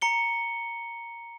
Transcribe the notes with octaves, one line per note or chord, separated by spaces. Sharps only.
A#5 C#7 G7